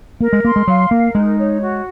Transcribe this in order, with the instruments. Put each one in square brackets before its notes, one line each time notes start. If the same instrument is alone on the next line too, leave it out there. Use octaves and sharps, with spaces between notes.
[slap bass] A#3 [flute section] A#4
[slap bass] G#3
[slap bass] A#3 [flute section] C6
[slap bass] G#3
[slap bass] F#3 [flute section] F5
[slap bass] A#3 [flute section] A#4
[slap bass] G#3 [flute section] D#4
[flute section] C#5
F#4